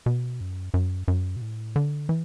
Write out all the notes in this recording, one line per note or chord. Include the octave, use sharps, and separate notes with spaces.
B2
F#2
F#2
F#2
B2
A2
D3
E3